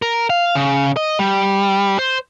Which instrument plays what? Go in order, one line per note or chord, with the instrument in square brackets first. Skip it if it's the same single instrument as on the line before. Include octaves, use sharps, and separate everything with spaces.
[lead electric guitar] A#4
F5
C#3
D#5
G3
C5